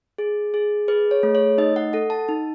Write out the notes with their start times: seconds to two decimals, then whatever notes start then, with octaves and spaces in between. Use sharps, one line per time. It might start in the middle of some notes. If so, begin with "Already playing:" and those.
0.18 G#4
0.54 G#4
0.88 G#4 B4
1.11 C#5
1.23 A3
1.35 C#5
1.58 D#4 D#5
1.76 F#5
1.93 A4 F#5
2.10 A5
2.28 D#4